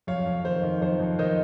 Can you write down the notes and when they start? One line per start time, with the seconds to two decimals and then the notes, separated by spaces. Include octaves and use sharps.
0.07 F2 C#5 F5
0.26 F2
0.44 D#3 C5
0.63 D#3
0.81 F2 C5
1.00 F2
1.19 D#3 C5 D#5